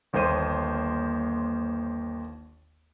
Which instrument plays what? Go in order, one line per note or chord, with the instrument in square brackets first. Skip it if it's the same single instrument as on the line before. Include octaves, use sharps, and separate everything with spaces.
[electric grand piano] G1 D#2 A#3 C5 D#7